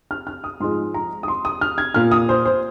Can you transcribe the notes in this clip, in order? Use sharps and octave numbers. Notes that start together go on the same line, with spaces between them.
F6
F6
D#6
G#2 F3 G#3 C6
A#5
D#6
C6
D#6
F6
G#6
A#2 A#3 F6
D#6
C5
C5